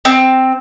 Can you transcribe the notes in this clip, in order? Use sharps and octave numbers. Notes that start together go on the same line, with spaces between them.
C4